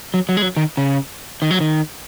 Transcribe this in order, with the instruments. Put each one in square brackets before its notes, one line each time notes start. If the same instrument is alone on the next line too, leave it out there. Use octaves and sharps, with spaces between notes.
[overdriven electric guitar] F#3
F#3
G#3
F#3
D#3
C#3
D#3
F#3
D#3